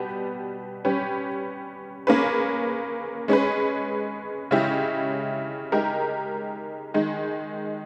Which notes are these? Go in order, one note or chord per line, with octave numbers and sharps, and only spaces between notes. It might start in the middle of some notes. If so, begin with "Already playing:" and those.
Already playing: B2 G3 B3 G4 B4
G3 C#4 G4 B4
A#3 C#4 G#4 B4
G#3 C#4 G#4 B4
C#3 G#3 C#4 E4 G4
G#3 D#4 G4 A#4
D#3 G#3 D#4